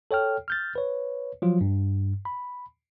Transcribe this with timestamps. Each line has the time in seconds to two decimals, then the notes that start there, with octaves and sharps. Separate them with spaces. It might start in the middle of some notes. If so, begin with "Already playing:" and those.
0.11 A4 C#5 G5 F6
0.48 F6 G6 A6
0.75 B4 C#5
1.42 F3 F#3 F4
1.61 G2
2.25 B5